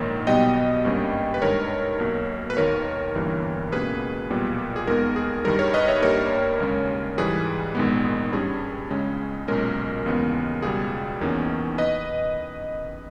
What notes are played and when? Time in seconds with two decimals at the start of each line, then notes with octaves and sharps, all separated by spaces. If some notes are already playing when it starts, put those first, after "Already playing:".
Already playing: A#1 G#2 D#3 A#3 C#5
0.27 B1 B2 G3 B3 D#5 G5
0.84 G#1 G2 G3 A#3 C#4
1.34 B4
1.42 G2 D#3 G#3 A#4 C#5
2.00 B1 B2 A#3
2.50 B4
2.57 D#2 D#3 A#3 A#4 C#5
3.15 G1 G2 E3 G3 A#3
3.72 C#2 B2 A#3 C#4 G#4 B4
4.30 B1 A#2 G3 B3
4.76 G#4
4.87 D#2 D#3 G#3 B3 A#4
5.16 G#4
5.44 G2 D#3 G3 A#4
5.59 A#4 C#5
5.74 B4 D#5
5.88 C#5 E5
6.02 G2 G3 A#3 A#4 C#5
6.60 D#2 C#3 G#3 C#4
7.18 G#2 E3 G3 G#4 B4
7.75 A#1 G#2 D#3 G#3 B3
8.32 G2 G3 C#4 G#4
8.90 C#2 C#3 G#3 C#4
9.48 B1 A#2 G#3 C#4 A#4
10.06 D#2 C#3 E3 G#3 B3
10.62 C#2 B2 G3 G#4
11.21 E2 D#3 A#3 C#4
11.78 B4 D#5